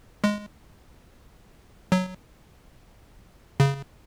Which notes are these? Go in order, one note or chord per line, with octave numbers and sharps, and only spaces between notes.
G#3
F#3
C#3